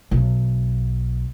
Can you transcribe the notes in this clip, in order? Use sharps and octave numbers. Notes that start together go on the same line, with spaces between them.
B1